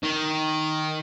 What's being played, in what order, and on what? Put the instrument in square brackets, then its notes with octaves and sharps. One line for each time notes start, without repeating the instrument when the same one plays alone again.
[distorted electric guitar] D#3